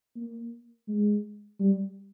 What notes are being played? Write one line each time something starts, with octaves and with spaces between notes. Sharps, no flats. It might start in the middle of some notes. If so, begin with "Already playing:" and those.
A#3
G#3
G3